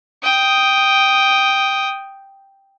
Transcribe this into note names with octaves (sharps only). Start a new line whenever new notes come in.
G5 D#6